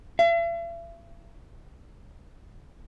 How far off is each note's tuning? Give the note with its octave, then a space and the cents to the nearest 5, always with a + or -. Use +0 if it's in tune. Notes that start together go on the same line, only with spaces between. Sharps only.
E5 +45